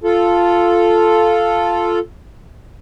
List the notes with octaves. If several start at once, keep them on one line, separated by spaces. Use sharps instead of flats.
F4 A4